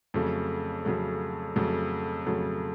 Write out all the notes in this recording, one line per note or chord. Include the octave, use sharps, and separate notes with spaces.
F2 C#3 F#3 A3
F2 C#3 F#3 A3
F2 C#3 F#3 A3
F2 C#3 F#3 A3